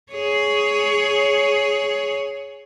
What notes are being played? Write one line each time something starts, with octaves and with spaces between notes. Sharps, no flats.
G#4 C#5